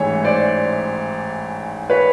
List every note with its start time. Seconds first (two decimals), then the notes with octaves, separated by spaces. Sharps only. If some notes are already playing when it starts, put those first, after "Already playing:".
Already playing: A1 G#2 E3 C#5
0.24 C5 D5
1.90 B4 C#5